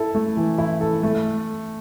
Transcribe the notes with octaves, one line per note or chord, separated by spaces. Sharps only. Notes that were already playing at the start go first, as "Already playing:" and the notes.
Already playing: E4 A4
A3
E3
E4
A4
A3